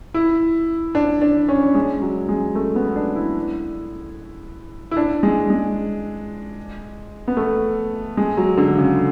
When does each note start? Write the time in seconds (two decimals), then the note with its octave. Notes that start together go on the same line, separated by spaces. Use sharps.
0.14 E4
0.95 D4
1.22 D4
1.48 C#4
1.75 G#3
2.02 F#3
2.29 G#3
2.55 A3
2.76 B3
2.96 D4
3.16 E4
4.91 E4
4.97 D4
5.23 G#3
5.50 G#3
7.28 B3
7.37 A3
8.17 G#3
8.37 F#3
8.57 D3
8.78 C#3